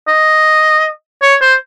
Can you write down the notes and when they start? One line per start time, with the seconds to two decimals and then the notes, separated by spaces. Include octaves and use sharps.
0.08 D#5
1.22 C#5
1.41 C5